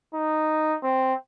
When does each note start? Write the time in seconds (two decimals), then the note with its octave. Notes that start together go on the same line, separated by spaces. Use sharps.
0.14 D#4
0.83 C4